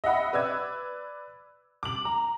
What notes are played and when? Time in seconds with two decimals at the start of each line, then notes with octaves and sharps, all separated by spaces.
0.04 D#5 E5 F#5 B5
0.33 B4 D5 E6 G#6
1.83 D6 F#7
2.05 A#5